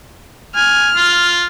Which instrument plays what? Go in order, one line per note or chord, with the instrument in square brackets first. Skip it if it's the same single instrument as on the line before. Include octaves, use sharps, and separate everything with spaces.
[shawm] G#5 [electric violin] F6
[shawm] F4